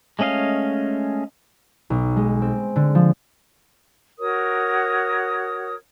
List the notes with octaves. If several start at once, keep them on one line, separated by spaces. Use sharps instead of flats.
G#3 A3 C#4 D#5 F5
B1
G#3
C4
D3
F3
F#4 A#4 C#5 D#6